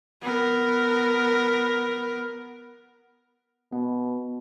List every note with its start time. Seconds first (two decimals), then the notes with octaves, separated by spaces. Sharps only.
0.22 B3 A#4
3.73 B2 B3